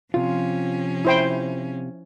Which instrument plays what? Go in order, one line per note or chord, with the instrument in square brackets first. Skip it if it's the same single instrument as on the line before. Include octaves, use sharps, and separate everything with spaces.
[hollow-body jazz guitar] C3 F4 [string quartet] F3 C#4
[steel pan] E4 C5 G5